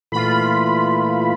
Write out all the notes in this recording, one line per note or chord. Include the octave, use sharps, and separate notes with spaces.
A#2 E3 A3 F4 B5